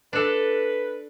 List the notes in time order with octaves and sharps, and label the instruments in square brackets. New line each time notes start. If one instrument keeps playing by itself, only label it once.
[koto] D4 A4 [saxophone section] B4